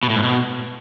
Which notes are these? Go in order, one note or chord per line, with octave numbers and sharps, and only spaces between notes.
B2
A2
G#2
B2